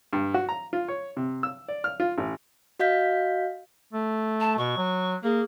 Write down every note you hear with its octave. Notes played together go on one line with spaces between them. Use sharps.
G2
F#4
A#5
F4
C#5
C3
E6
D5
F6
F4
A1
F#4 D#5 F5 G6 B6
A3
A5
B2 C#6
F#3
A#3 G#4